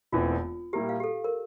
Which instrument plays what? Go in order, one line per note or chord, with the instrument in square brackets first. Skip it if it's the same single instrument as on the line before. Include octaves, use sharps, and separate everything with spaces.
[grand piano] E1 E2 E3 A3 C4 [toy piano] F4
[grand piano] A#2 G3 A#3 E4 A#4 [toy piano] G4
[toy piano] F5
G4
A4
A#4